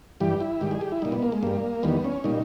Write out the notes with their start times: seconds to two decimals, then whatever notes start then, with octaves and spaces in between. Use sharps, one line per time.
0.20 G2 E3 G3 G4
0.40 E4
0.61 G#2 D#3 G3 G4
0.71 G#4
0.81 G4
0.92 E4
1.02 A#2 G3 D#4
1.12 B3
1.22 A#3
1.32 G#3
1.43 G2 G3 A#3
1.83 E2 D#3 G3 B3
2.04 C#4
2.24 A#2 G3 D#4